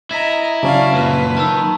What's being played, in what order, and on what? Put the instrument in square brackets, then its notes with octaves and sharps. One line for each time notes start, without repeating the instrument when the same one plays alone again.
[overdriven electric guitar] E4 [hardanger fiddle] D#5 A#5 [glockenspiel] G#6 B6
[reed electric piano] C#3 F#3 C#4 [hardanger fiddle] D5 F5 [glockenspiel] A5 C#6
[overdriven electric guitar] F#2 A#2 [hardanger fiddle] B4
[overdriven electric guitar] D#3 [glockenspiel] A5 A#5 E6